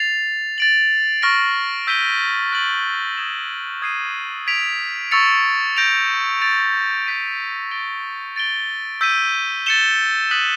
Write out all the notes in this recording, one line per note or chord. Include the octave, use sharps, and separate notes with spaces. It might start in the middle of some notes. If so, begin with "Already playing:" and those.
Already playing: A6 C7 F7
A6 D7 F#7
C#6 F6 A#6 D7
E6 G6 B6 D#7 G7
F#6 A6 D7 F#7
D#6 G#6 B6 E7 G7
D#6 G#6 C7 D#7
G#6 B6 D7 F7
C#6 E6 A6 C#7 F7
G6 A#6 D7 F7
A6 D7 F7
G6 B6 D#7
A6 D7 G7
A6 D7 G7
E6 G6 B6 D#7
A6 C#7 E7 G7
D#6 F#6 B6 D#7 F#7